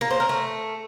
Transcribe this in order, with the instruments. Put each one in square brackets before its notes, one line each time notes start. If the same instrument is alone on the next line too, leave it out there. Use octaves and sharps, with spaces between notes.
[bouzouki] A#3
C5
A#4
A3